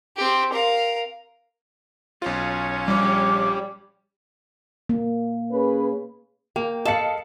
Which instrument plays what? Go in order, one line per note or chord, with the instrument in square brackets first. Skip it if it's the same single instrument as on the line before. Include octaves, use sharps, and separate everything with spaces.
[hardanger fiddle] C4 G4
A#4 F5
[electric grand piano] B1 F4 [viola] C#4 C#5
[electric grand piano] A#1 F3 [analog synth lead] G3 [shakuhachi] D6
[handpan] A#3
[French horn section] C#4 G#4 B4
[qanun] A#3 [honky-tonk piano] G5
[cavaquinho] A4 [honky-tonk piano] D#5 F5 C#7 [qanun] A5 B5